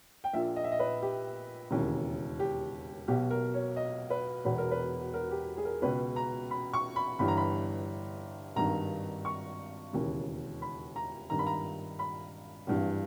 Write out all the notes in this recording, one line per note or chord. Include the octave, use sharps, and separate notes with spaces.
G5
A#1 A#2 E5
D#5
E5
D#5
B4
G4
E1 D#2 C#3 E3
G4
B1 B2 G4
A#4
C#5
D#5
B4
E1 E2 B2 B4
A#4
B4
A#4
G4
G#4
A#4
C#2 B2 B4
A#5
B5
C#6
B5
G1 G2 E3 B5
A#5
B5
G#1 G2 D#3 A#5
C#6
E1 D#2 C#3 E3
B5
A#5
G#1 G2 D#3 A#5
B5
A#5
B5
G#1 G2 E3